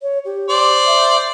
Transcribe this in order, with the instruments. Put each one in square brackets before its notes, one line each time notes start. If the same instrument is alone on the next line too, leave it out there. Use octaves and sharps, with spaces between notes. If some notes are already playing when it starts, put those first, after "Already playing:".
[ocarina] C#5
G4
[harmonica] C5 D5
[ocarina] E5